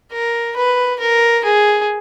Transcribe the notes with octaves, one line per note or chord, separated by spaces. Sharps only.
A#4
B4
A#4
G#4